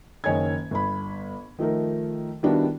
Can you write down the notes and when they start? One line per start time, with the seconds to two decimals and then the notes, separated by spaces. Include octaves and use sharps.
0.24 F#1 D#3 C#5 D#5 G#5 G#6
0.71 G1 B5
1.59 D#3 F3 A3 D#4 A#4
2.43 D#3 G3 B3 D4 E4 F#4